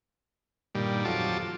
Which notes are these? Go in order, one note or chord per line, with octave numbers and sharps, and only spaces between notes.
G2 A#2 D#3 G3
F2 F#3 F4 A4 A5 D6